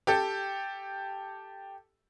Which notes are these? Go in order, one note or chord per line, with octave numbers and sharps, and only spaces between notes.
G4 A4